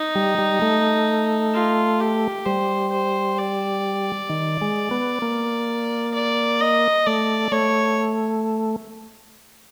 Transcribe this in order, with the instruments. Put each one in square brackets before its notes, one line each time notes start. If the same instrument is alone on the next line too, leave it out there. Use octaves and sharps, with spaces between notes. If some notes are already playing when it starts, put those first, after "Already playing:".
Already playing: [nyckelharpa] D#4
[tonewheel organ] G3
G3
A3
[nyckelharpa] F4
G4
[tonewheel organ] G3 [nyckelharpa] C5
[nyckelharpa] C5
D5
[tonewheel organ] D#3
G#3
B3
A#3
[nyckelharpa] D5
D#5
[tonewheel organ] A3 [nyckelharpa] D5
[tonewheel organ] A3 [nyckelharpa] C#5